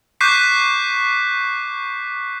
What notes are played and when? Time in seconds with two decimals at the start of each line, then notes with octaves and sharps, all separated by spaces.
0.21 C#6 D6 F#6 G6 B6 C7